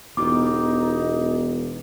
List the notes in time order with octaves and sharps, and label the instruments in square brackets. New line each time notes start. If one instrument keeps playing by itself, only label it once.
[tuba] E1 [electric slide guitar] B3 F4 G4 [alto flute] D#4 [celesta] D6